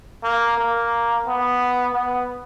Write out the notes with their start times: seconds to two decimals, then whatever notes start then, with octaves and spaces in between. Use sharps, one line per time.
0.23 A#3
0.57 A#3
1.26 B3
1.93 B3